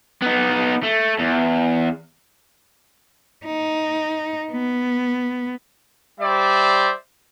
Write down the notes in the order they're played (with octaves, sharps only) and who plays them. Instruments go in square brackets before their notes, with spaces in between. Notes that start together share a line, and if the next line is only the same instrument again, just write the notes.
[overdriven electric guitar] B3 D#4
A3
E2
[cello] D#4
B3
[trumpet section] G3 C5 D5 E5